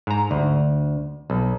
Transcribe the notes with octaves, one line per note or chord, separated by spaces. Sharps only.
G#2 A#5
D2
B1